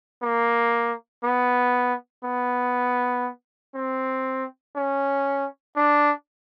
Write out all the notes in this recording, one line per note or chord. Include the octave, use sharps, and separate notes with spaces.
A#3
B3
B3
C4
C#4
D4